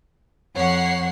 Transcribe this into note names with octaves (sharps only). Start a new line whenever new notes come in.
F2 C#5 F#5 C7